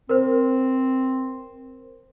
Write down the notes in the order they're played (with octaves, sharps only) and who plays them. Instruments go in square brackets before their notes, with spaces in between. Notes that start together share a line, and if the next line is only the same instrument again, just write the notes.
[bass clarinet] C4 [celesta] A#4 C5